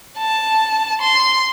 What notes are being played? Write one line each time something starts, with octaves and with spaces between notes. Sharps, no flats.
A5
C6